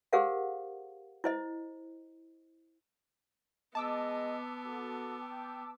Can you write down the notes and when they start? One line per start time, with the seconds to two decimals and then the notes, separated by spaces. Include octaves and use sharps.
0.13 G4 G#4 A#4 C5 F5 F#5
1.24 E4 C5 D#5
3.75 G#3 B3 D#5 A5 D6 E6
4.66 F#4 A4
5.22 G5